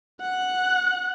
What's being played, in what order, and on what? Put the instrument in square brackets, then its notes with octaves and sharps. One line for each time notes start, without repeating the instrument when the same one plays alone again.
[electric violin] F#5 F#6